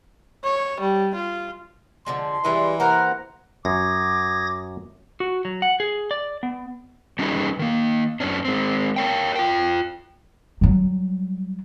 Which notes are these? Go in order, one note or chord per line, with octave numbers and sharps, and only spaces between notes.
C#5
G3
F4
D3 F3 G#3 C6
E3 G3 G#3
A#3 A#4 C5 F#5 A#5
F#2 D6 D#6 G#6 A#6
F#4
F#3
F#5
G#4
D5
B3
G3 C#4 D#4 G#4 B4
D#3 A#3
F#2 B3 C#4 D4
G#3 C4
A#4 C#5 G5
F4 G5
F#3 G3